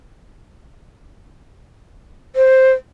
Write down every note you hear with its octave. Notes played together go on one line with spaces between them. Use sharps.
C5